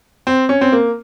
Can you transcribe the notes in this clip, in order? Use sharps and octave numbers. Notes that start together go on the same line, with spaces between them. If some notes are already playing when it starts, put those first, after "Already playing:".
C4
C#4
C4
A#3